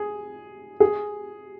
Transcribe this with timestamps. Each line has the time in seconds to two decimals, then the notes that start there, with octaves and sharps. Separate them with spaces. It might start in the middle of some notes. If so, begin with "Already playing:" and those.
Already playing: G#4
0.80 G#4